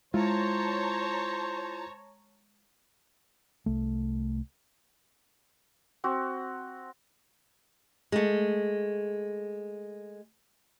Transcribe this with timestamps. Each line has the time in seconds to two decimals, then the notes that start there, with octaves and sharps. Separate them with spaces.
0.14 G#3 E4 F4 C5 C#5 A5 A#5
3.66 C2 A3
6.04 C4 F#4
8.12 G#3 A3